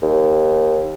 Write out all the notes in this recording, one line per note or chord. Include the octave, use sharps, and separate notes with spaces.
D#2